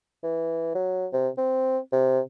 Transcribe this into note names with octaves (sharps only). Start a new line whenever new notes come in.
E3
F#3
C3
C4
C3